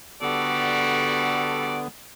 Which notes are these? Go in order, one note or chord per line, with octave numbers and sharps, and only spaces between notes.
D3 G3 B3 F#4 A4 D5